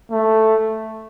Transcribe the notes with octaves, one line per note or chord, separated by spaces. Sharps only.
A3